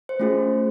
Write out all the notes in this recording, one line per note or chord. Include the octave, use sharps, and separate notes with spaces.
C5
A3 C#4 F4 G#4